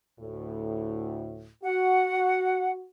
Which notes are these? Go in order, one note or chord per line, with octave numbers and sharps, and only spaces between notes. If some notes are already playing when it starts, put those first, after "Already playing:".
D2 A2
F#4 F#5